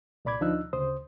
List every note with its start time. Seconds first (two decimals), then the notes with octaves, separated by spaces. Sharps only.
0.25 C2 A#2 D5 B5 D6 G#6
0.41 D2 F3 D4 D#4 E6 F#6
0.73 D2 C#3 C5 D#6